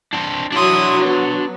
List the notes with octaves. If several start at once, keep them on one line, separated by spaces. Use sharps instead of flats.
C4 D4
F#3 D4 E4 C6 D#6
B3